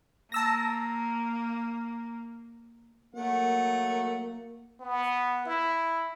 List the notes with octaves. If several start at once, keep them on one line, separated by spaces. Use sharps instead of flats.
A#3 A5 E6 A#6
F#3 A3 A#3 F#5
B3
E4